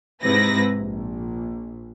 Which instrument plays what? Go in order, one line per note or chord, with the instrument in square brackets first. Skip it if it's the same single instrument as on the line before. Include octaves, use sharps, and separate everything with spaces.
[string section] G#2 C3 E4 B4 A#6
A#1